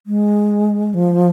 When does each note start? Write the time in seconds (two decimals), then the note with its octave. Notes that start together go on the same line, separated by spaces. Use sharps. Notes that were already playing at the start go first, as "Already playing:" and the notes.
0.07 G#3
0.94 F3